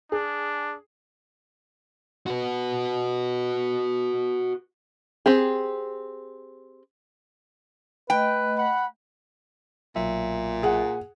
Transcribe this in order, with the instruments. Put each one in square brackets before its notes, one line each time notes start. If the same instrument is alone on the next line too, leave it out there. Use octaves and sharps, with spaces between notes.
[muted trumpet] D4 [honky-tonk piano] G#4
[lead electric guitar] F#4 B4
[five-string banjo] C4 G4 G#4
[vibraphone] A3 D#5 [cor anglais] B4 [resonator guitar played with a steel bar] G5
[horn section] F#5 B5
[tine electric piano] B1 F#3 E5 [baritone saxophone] A#2
[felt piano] G#4 F#5